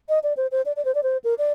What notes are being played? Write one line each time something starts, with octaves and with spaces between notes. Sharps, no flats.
D#5
D5
C5
C5
D5
D5
C5
D5
C5
A#4
D5